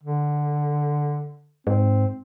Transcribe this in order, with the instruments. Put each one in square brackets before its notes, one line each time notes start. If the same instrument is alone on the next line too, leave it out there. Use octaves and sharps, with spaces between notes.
[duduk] D3
[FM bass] G#2 [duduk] C4